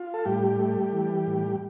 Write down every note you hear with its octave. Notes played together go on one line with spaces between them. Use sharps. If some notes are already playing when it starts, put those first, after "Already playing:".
Already playing: F4
A4
A2 G3 G4
A3
E3
A2